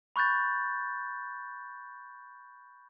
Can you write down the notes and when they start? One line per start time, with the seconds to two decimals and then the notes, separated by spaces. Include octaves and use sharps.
0.16 B5 C#6 F#6 G6 A6